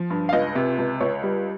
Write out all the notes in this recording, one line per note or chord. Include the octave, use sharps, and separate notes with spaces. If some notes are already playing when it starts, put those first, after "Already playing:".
Already playing: F3
G2
F5
C#2 D#5
C3
C#2
C#2 C#5
G3